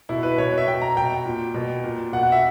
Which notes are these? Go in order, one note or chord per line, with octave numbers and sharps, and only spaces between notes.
B2 E4
B4
B2 C#5
E5
B2 G5
A#5
B2 G5
A#2
B2
A#2
B2 F#5
F#5
E5